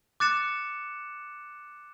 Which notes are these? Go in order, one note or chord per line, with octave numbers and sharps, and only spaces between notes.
D6 F#6 A6 C#7 E7